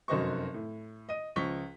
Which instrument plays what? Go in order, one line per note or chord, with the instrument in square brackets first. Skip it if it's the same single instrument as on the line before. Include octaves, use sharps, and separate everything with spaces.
[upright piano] F1 F#2 F#4 C5 D#5 C#6
A2
D#5 D#7
C#2 F3 C#6 B6 G7